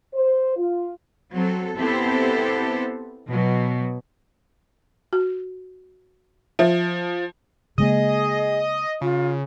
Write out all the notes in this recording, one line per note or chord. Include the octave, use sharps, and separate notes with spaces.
C5
F4
F#3 C4 A4
B3 C4 E4 G4 A4 C5
B2 F#3
F#4
F3 E5
C#3 G#3 A#3 G#4 D#5
C#3 F4